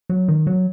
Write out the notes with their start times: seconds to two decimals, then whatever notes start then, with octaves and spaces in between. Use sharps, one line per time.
0.10 F#3
0.28 D#3
0.47 F#3